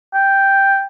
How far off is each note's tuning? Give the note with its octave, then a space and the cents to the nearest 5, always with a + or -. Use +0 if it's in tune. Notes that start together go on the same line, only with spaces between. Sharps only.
G5 +0